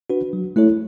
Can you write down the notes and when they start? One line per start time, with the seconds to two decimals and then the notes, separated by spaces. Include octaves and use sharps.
0.10 D4 F#4 B4
0.33 F#3
0.56 A3 E4 A4 C#5